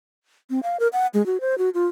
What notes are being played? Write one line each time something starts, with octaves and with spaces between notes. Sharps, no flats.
C4
F5
A#4
F#5
G#3
F#4
C5
F#4
F4